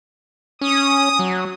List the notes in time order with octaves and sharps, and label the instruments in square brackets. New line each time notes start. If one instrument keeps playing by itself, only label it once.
[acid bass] C#4 [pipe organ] D#6
[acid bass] F#3